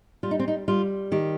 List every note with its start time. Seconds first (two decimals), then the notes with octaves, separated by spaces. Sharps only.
0.23 G3 F4
0.31 D#4
0.39 C4
0.48 D#4
0.68 G3 F4
1.12 D#3 G4